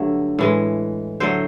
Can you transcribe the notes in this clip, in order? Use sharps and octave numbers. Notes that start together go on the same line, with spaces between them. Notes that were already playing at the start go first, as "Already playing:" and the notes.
Already playing: G2 D3 F#3 A3
A2 E3 G#3
D3 F#3 A3 C5